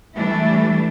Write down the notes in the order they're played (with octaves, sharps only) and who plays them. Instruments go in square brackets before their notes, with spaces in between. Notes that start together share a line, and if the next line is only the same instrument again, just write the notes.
[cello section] E3 G3 A3 D4 E4